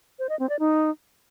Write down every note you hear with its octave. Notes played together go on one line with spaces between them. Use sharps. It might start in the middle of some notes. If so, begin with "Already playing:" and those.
C5
D#5
C4
D5
D#4